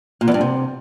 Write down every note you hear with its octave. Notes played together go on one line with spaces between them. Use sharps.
A#2
E2
G2
C3